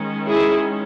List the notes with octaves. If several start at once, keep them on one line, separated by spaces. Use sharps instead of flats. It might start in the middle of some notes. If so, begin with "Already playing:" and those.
Already playing: D#3 G#3 C#4
E4 G#4